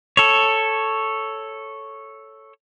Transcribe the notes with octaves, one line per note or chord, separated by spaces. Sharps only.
A4 C#5